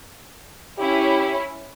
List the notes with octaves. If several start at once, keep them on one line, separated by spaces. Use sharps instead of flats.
C#4 E4 G4